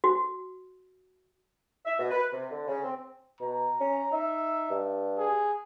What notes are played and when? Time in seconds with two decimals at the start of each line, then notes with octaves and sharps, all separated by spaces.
0.04 F#4
1.85 E5
1.97 B2
2.10 B4
2.32 C3
2.50 D3
2.67 C#3
2.84 C4
3.41 B2 A#5
3.80 C#4
4.12 D#4 E5
4.70 G2
5.18 G#4